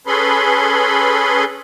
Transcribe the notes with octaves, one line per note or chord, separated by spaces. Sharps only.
C#4 G#4 A4 B4 B5 C6